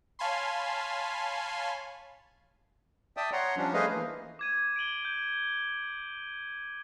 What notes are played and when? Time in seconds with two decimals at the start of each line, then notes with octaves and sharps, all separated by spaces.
0.19 C#5 F5 G#5 A5 B5 C6
3.17 D5 E5 G5 A5 D#6
3.33 C#5 F#5 A#5 C6
3.57 F3 G3 C#4 D4
3.74 A3 G#4 B4 C5 D#5 F5
3.94 E3 A#3
4.39 D6 G#6 D#7
4.76 D7 D#7 F#7 G7
5.05 G6